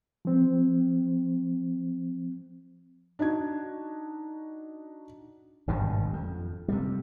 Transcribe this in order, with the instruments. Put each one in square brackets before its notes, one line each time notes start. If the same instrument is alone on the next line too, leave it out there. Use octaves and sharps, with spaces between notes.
[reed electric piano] F3 C4
[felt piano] D4 D#4 F#4 G#6
[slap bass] G#1 G2 B2 D3
F2
C3 G3